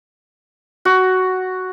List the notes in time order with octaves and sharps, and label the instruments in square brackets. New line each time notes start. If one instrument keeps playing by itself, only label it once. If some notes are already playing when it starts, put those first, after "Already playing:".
[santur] F#4